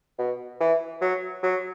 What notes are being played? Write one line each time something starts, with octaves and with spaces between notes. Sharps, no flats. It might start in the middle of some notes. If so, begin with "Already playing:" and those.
B2
E3
F#3
F#3